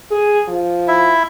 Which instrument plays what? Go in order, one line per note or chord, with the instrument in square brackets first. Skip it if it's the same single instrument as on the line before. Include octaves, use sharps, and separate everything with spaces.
[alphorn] G#4
F3
[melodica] E4 E5